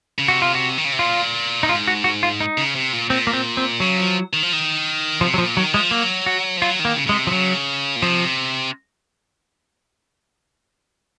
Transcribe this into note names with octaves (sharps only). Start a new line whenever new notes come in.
C#3
C3 F#4
F4
F#4
D#3
C#3
C3
A#2 F4
D#4
G#2 F4
F#4
F#4
F4
D#4
C#3
C3
A#2
A#2 C4
A#3
C4
C4
C#3 F#3
F3
D#3
F3
D#3
C3 F3
F#3
A#2 F3
D#3 F#3
F3 G#3
F#3 A#3
F#4
F3
F#3 F4
D#3
A#3
C#3
C#3 G#3
C3
F3
C#3 F#3
A#2
C3 F3